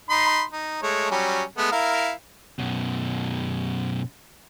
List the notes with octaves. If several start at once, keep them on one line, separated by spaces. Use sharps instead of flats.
D#4 B5 C6
D#4
G#3 A3 C#5
F#3 G3 C#4
G#3 A3 B3
E4 A#4 F5
F#2 B2